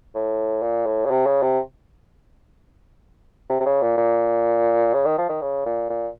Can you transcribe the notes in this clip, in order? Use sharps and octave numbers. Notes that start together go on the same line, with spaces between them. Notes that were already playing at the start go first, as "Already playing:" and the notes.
A2
A#2
A2
C#3
C3
C#3
C3
C3
C3
C#3
A#2
A#2
C#3
D#3
F3
D#3
C#3
A#2
A#2